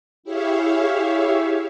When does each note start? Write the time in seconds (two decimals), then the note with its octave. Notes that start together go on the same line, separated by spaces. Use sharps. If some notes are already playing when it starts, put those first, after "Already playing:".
0.23 E4 G4 G#4 C#5 E5 F5